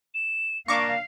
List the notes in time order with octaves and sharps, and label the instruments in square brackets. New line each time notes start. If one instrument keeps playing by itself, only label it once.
[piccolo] E7
[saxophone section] A#3 D4 [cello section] F5 [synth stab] C#6 D6 [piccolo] A#6